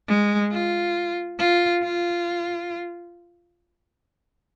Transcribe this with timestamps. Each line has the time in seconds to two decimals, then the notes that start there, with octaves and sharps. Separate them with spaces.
0.08 G#3
0.52 F4
1.39 F4
1.83 F4